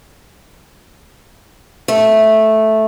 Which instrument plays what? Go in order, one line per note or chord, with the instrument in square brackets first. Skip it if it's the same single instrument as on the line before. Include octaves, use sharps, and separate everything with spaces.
[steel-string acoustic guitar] A3